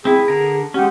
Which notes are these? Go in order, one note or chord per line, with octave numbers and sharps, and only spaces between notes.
C4 E4 G#4
D3 A#4
G#3 C#4 G4 F#5